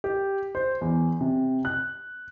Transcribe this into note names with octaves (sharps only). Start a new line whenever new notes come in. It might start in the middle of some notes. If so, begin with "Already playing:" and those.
G4
C5
E2
C3
F#6